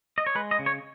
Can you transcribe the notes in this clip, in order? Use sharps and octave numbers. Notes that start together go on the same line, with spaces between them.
D#5
C#5
G#3 B4
D#5
C#3
C#5